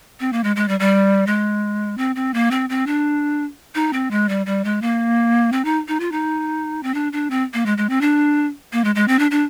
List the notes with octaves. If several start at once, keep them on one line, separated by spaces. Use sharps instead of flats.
C4
A#3
G#3
G#3
G3
G3
G#3
C4
C4
A#3
C4
C4
D4
D#4
C4
G#3
G3
G3
G#3
A#3
C4
D#4
D#4
F4
D#4
C4
D4
D4
C4
A#3
G#3
G#3
C4
D4
A#3
G#3
G#3
C4
D4
D4